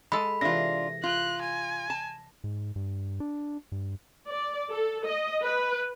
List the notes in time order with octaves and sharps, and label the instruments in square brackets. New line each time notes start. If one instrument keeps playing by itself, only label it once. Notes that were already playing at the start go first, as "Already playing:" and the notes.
[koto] G#3 A4 [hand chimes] B5
[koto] C3 E3 [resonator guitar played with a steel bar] D4 F4 [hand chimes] A#6
[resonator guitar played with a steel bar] F4 [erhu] F#6
[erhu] G#5
[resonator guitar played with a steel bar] A5
[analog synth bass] G#2
G2
D4
G2
[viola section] D5
A4
D#5
B4